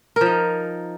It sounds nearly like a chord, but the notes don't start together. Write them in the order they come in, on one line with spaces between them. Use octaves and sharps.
A#4 F3 D#4